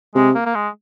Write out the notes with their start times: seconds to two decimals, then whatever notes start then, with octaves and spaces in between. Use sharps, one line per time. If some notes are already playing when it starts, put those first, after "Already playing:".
0.15 C3 G#3
0.35 A#3
0.45 A#3
0.55 G#3